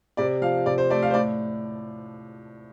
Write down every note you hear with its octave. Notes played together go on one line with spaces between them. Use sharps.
C3 D5
F3 F5
C3 D5
C5
A3 D5
F5
C5
A2 D5